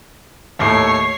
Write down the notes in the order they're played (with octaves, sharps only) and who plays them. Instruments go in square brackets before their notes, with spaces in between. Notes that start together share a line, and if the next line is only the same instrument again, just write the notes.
[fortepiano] D#2 A2 A4 [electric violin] C#5 C7